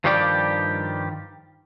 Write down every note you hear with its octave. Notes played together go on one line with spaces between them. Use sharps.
G2 D#3 F3 G3 G4 D5